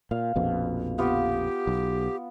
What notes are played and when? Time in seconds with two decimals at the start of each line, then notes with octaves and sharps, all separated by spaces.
0.11 A#2 F5
0.36 A#1 F2 B2
0.98 B3 F4 G4
1.67 B1